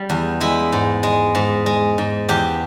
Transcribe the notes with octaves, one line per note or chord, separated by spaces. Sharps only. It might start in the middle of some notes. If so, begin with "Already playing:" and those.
Already playing: G3
E2
G#3 E4
G#2
G#3
G#2
G#3
G#2
E2 G4